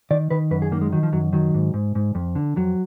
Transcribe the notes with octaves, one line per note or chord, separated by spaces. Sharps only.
D#3 D5
D#3 B4
F#2 B4
G#4
D#3 A#3
G#3
D#3 F#3
F3
F#2 F#3
D#3 F#3
G#2
G#2
G#2
F2
D3
F2 F#3